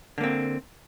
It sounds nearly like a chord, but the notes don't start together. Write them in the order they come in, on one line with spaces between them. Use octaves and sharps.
D3 A#3 C4